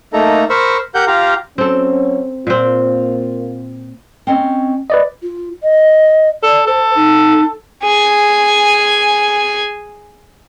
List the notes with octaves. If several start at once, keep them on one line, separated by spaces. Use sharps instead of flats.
A3 A#3 D#4 A4 A#5
A#4 C5 B5 C#6 E6
G4 A#4 F#5 G6
F4 G4 F5 A#5
F#3 C4 C#4 A4
A#2 A#3 C4 F4
C4 C#4 D#5
B4 D5 D#5
F4
D#5
A4 D5
A4 C5
D#4
G#4 G#5